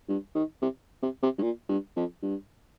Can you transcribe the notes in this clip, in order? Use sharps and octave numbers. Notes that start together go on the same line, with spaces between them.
G2
D#3
C3
C3
C3
G2
A#2
G2
F2
G2